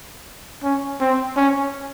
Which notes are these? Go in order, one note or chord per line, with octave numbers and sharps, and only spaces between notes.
C#4
C4
C#4